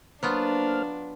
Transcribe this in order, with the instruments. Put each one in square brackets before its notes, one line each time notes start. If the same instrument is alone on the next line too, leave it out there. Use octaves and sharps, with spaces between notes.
[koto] F#3 B3 F4 [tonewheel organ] A#3 C5 F6 [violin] D4